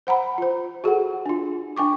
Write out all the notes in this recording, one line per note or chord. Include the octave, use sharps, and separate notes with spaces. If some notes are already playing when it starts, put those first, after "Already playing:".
C5 F#5 A#5 B5
F4 C5
F#4 G#4 A4 F#5
D4 F4
D4 G5 C#6 D6